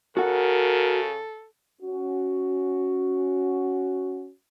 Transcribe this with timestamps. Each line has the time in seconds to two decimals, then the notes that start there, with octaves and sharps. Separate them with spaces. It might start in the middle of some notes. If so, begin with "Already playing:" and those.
0.17 C#3 F#4 A4 A#4 F#5
1.81 C#4 F#4